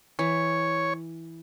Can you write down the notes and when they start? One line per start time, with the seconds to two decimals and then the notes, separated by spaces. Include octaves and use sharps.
0.19 E3 C#5